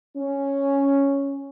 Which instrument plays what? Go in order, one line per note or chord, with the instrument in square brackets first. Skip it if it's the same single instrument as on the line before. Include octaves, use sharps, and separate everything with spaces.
[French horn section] C#4